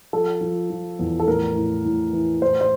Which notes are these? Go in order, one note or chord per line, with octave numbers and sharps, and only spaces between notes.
F3 A4
F3
F3
E2
A4
A2 A#4
A2
A2
E3
A2 C5
C5